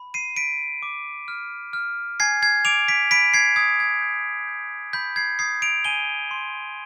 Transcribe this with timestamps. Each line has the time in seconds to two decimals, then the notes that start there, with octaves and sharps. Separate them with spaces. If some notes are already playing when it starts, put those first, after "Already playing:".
Already playing: B5
0.14 C7 D#7
0.37 B5 B6 D7
0.82 D6
1.28 F6
1.73 F6
2.20 G#5 G#6 C7
2.42 G#6 C7
2.65 D6 D7 F7
2.88 B6 D7
3.11 B5 B6 D7
3.34 G#6 C7
3.56 D#6 G#6
3.80 G#6
4.02 G6
4.48 G6
4.93 B5 G6 B6
5.16 G#6 C7
5.39 D#6 G#6 C7
5.62 D7 F7
5.85 G#5 D#7 G7
6.31 C6